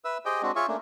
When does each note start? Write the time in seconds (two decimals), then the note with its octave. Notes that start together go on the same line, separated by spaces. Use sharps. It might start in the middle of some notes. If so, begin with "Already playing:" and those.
0.05 B4 E5 E6
0.25 G4 G#4 C5 D#5 G5
0.42 G#3 C4 D4 F#4
0.56 F4 G#4 C#5 E5 F5 C#6
0.68 A3 A#3 C#4 D4